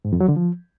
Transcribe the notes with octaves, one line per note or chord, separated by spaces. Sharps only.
G#2
F2
F#3
D3
F3